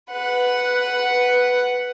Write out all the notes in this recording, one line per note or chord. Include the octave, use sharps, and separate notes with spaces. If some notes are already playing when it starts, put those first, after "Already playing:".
B4 F#5